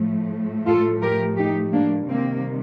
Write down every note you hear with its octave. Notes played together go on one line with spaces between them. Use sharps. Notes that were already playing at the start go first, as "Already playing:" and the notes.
Already playing: A2 F3 A3
F4 A4
G4 A#4
D#4 G4
A#3 D4
C3 D#3 G3 A#3 C4